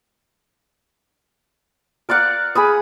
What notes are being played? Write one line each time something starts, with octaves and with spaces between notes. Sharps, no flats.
A#4 D5 F5 F#5
G#4 B5 D#6